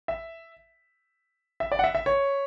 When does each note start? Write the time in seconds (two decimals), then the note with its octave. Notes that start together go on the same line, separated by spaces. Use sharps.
0.08 E5
1.60 E5
1.72 D5
1.79 F#5
1.84 E5
1.95 E5
2.06 C#5